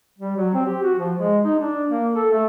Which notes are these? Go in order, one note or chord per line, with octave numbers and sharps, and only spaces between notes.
G3
F#3
C4
G4
F#4
F3
G#3
D#4
D4
A#3
A4
A3